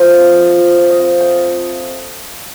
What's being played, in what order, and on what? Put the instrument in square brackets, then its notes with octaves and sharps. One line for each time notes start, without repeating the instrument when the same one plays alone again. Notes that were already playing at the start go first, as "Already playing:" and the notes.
Already playing: [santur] F3 A3 F4 C5 D#5 F5
C4
A3
F3
F4 F5
D#5
C4 F5
A3 G5